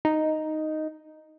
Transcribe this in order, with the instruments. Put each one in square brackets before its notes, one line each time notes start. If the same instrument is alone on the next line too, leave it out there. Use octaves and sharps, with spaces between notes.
[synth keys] D#4